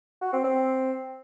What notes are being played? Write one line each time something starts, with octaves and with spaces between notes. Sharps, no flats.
F#4
C4
C4